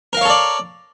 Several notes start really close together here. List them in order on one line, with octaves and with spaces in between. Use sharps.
A#4 F5 C#5 A4 D5